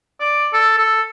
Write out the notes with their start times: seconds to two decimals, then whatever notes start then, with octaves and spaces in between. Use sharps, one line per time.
0.21 D5
0.54 A4
0.78 A4